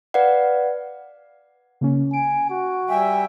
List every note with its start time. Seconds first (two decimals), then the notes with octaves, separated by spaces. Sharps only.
0.14 B4 D5 F5 F#5
1.81 C#3 A#3 C#4
2.13 G#5 D7
2.50 F#4
2.89 G3 E5 G5 G#5